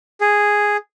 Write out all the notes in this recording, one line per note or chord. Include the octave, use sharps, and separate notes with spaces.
G#4